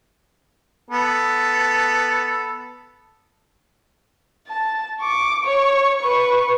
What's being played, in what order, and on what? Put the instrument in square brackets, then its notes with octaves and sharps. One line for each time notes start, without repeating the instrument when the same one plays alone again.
[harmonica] B3 A4
[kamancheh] A5
C#6 D6
C#5 C#6
B4 C#6